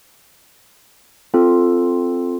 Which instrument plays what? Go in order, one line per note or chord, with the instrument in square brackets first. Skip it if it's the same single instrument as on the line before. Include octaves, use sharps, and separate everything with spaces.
[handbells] C4 F4 A4